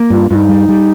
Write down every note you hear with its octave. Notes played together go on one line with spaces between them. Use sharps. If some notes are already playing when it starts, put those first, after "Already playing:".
Already playing: A#3
G2 F4
G2 D#4 F4
G3
G3